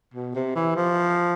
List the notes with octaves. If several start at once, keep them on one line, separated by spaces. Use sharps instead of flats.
B2
C3
E3
F3